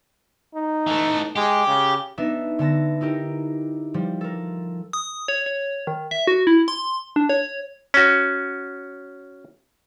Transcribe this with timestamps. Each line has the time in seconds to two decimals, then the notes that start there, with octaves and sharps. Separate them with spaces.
0.55 D#4
0.87 E3 A3
1.36 G#3 G4
1.67 C#3
2.18 B3 D4 D#4 E5
2.59 D3 B3 A5 A#6
3.01 D#4 E4 G4 A#4
3.94 F3 G3
4.21 A4 A#4
4.93 D#6
5.28 C#5
5.46 C#5
5.87 D#3
6.11 E5
6.27 F#4
6.47 E4
6.68 C6
7.16 D4
7.29 C#5
7.94 C#4 F#4